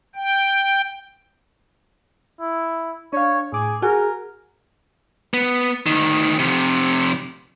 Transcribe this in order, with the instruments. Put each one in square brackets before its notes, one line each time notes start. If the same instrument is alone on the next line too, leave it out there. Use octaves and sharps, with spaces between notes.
[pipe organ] G5
[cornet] E4
[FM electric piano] D4 F5 [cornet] C#5
[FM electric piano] A2 D6 [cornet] G#4
[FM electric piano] F#4 F#5 G#5 [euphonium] G#4 [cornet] A#4
[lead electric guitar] B3
D2 D#3
F2 C3